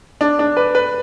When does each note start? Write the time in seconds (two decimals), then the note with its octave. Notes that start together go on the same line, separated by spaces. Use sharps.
0.21 D4
0.39 D4
0.57 B4
0.75 B4